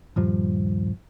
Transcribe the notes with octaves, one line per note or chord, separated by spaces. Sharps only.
D#1 G2 F3